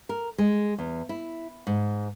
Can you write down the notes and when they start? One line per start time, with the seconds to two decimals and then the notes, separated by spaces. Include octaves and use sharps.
0.09 A#4
0.38 G#3
0.78 E2
1.09 E4
1.67 G#2